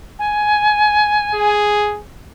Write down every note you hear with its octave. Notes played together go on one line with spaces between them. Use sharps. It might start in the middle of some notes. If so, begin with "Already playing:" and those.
G#5
G#4